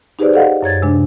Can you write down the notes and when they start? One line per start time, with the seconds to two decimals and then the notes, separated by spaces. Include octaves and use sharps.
0.19 D#4 G4 G#4 B4 C5 D5
0.34 A4 D5 D#5 F5 F#5
0.63 F#2 C#5 G#6 A6
0.82 C3 G#3 D4